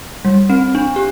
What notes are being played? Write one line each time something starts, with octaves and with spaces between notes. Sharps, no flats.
G3
C4
D4
G4